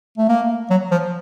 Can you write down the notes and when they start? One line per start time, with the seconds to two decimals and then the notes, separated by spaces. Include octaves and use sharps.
0.18 A3
0.29 A#3
0.70 F#3
0.91 F3